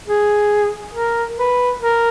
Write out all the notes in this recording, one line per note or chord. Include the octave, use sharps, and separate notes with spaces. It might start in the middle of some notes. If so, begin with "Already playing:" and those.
G#4
A#4
B4
A#4